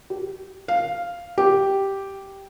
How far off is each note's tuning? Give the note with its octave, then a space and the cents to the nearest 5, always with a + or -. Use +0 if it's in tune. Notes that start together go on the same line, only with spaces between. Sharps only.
G4 -20
F5 -5
G4 -5